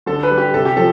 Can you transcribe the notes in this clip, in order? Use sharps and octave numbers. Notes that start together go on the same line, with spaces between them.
D3 A4
B4
G3
G4
C3 A4
G4
F3 A4